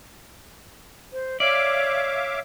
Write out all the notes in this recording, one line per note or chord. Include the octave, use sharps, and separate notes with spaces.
C5
C#5 D5 E5 F5 D6